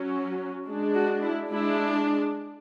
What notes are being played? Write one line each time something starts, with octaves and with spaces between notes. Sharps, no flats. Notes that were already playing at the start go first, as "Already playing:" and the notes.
Already playing: F#3 C#4
G#3 D4
F#4
E4
G#3 D4 E4